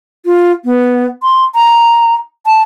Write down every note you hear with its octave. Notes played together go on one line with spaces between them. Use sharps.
F4
B3
C6
A#5
A5